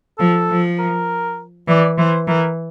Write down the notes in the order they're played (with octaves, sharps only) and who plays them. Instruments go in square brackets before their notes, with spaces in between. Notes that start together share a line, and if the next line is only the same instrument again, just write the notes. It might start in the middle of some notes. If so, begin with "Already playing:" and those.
[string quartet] F3 [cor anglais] A4
[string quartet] F3
[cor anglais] A#4
[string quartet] E3 [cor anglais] D5
[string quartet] E3 [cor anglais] C5
[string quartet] E3 [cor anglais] A#4